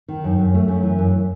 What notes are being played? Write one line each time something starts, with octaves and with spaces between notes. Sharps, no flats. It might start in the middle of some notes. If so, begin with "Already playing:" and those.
D#3
F#2
F#2
A3
F#2
E3
F#2